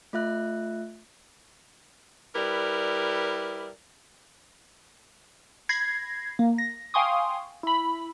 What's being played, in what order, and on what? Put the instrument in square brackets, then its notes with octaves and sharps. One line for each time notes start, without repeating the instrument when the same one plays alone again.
[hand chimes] A3 F4 E5 F#6
[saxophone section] G3 E4 G4 A#4 B4 D5
[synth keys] B5 G#6 A#6 C7
A#3
A#6
F5 G5 G#5 C6 C#6 D#6
E4 B5